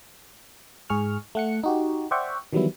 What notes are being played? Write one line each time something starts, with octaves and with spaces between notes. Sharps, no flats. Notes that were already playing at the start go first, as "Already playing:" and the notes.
G#2 G#4 C#6 F6
A3 F#5 C#7
D#4 F#4 G4
C5 D5 E5 F#5 G5 C#6
D#3 E3 F#3 G3 B3 E4